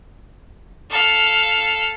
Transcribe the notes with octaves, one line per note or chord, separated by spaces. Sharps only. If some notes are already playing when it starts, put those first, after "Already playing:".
A4 F5